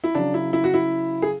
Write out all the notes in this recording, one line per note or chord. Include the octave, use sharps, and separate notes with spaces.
E4
C#3 F#3 D4
E4
E4
F#4
E4
G#4